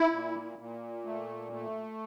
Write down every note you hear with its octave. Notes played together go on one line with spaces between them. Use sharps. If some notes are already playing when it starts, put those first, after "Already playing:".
Already playing: E4
A#2
A#2
A3
A3